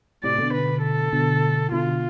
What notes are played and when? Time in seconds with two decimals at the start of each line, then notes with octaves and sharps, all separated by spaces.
0.24 A2 C3 D5
0.38 B2 D3
0.54 B4
0.84 A4
1.13 B2 D3
1.72 B2 D3 F4